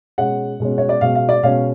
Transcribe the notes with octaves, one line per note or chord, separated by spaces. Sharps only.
B2 G#3 C#4 F#5
B2 G#3 C#4
C#5
D5
B2 G#3 C#4 F5
F5
D5
B2 G#3 C#4 F5